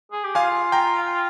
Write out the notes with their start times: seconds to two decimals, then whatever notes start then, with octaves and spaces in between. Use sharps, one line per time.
0.12 G#4
0.24 G4
0.35 F4 F5 G#5
0.72 G5 A#5